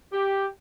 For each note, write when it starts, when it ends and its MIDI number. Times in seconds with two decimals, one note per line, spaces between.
0.13 0.46 67